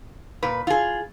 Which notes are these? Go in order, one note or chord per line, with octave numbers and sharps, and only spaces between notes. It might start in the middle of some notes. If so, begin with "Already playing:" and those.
A#2 B4
F4 G#4